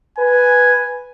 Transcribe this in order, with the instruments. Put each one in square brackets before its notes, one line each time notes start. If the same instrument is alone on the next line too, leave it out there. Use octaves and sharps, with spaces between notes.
[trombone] B4 [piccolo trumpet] G#5